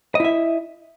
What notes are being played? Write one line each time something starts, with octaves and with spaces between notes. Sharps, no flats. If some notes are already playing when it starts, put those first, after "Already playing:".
E4 D#5 E5